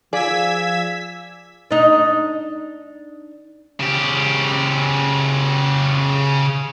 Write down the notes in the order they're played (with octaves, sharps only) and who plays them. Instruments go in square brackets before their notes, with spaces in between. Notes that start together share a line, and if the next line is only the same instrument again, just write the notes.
[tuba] F3 [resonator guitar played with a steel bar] G#4 D5 [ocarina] F5 [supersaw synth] E6 G#6 B6
[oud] D4 D#4
[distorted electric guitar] C#3 G4